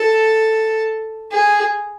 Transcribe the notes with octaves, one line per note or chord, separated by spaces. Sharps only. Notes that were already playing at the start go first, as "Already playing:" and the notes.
Already playing: A4
G#4